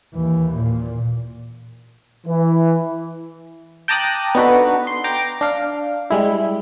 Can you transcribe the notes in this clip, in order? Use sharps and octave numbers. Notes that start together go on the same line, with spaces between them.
D#2 E3
A#2
E3
G5 A5 A#5 D6 D#6 F#6
B3 D4 D#4 F#4 A4 B4
C6
G5 A#5 D6
D4 F5
G3 G#3 E4